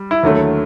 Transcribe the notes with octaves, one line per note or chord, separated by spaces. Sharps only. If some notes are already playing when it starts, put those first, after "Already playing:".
Already playing: G3
E4
D#2 D3 F#3 A3